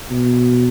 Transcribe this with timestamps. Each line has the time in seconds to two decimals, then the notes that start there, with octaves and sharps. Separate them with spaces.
0.10 B2